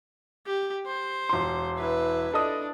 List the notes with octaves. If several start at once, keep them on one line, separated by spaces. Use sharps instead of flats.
G4
C5
E1 C6
E4 B4
D4 A4 D#5 D#6